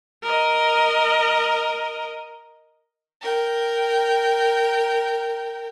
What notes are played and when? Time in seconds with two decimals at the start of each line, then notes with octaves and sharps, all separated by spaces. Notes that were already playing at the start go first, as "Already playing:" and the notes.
0.23 A#4 D#5
3.21 A#4 G5